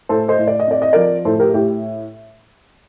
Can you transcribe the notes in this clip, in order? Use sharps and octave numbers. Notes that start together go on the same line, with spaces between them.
A2 A4 C5
C5 D#5
A2
D5
D#5
C4 D5
D#5
F3 A#4 D5
A2 A4 C5
G4 A#4
A2 G4